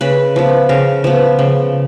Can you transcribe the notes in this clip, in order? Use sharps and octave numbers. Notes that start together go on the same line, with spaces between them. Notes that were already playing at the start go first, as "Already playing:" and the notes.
C#3 B4
F3 B3
C#3 A#4
F3 B3
C#3